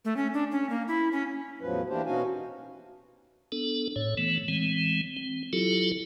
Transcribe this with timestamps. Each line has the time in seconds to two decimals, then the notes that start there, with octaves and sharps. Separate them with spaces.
0.05 A3
0.17 C#4
0.33 D4
0.51 C#4
0.70 A#3
0.88 E4
1.12 C#4
1.61 E2 A2 F3 F#3 B4
1.89 E3 A#3 D4 E4 G4 C5
2.06 B2 C#4 D#4 F#4 F5 G#5
3.52 B3 D4 A4
3.96 A2 C#5
4.18 E3 A3 B3
4.48 E3 G#3 C4
5.17 C4
5.53 F#3 E4 F4 G4 A4